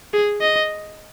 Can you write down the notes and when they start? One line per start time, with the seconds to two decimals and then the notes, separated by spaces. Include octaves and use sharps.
0.14 G#4
0.41 D#5